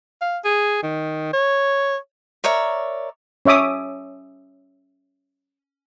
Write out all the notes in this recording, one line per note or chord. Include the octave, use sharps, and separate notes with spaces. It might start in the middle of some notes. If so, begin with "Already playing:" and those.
F5
G#4
D#3
C#5
A#4 C#5 D5 E5
C#4 C#5 E5 D6 D#6